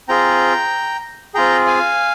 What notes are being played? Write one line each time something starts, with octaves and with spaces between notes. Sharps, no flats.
C4 F4 G#4 G5 A#5
C4 F4 G#4 G5 A#5
F5 G#5